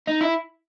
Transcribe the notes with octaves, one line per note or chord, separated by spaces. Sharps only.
D#4
E4